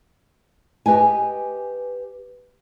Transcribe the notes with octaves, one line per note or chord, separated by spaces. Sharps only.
G4 B4 D#5 G#5